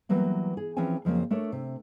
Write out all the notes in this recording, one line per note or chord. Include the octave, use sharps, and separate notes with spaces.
E3 F#3 G3 A#3 B3
G#4
E3 F3 C4 C#4 G5 G#5
F2 C#3 F3 F#3 G#3 A#3
A3 D4 A4 A#4 C#5
C3